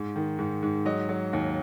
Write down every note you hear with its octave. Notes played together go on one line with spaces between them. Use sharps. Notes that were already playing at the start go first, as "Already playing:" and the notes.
Already playing: G#2
D#3
G#2
G#2
F#3 D#5
F#3
D#2